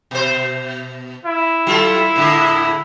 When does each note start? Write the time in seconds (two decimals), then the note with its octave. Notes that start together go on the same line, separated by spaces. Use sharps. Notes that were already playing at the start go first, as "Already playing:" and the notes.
0.11 B2 C5
1.26 E4
1.67 F#3 F4 A4
2.16 A2 D3 G#3